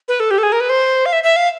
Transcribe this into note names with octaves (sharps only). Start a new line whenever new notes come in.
B4
A4
G4
A4
G#4
A#4
B4
C5
F5
E5
E5
F5